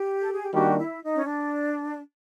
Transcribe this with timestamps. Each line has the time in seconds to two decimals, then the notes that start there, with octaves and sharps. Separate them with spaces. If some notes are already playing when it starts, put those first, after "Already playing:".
Already playing: G4
0.20 A4
0.32 G#4
0.42 G4
0.53 D#3 G3 A#3 D4 F#4 G4
0.77 E4
1.01 D#4
1.15 C#4
1.25 D4